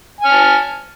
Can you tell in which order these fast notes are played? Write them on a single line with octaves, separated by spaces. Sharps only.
G#5 F6 A5